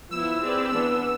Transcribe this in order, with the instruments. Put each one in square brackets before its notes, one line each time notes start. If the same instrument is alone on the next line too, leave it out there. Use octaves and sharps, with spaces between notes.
[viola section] F3 B3 E4 [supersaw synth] E6
[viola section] C4 G#4 B4 D5
[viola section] E3 B3 D4 [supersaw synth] E6